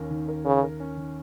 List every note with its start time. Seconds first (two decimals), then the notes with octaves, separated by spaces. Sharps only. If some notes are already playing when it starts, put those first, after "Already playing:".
Already playing: D#2 C#4 A#4
0.11 D#3
0.28 A#4
0.45 C#3 A#4
0.63 A#4
0.80 C#4
0.97 D#3